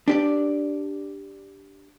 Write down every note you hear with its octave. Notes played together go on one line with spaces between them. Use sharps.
D4 G4 D5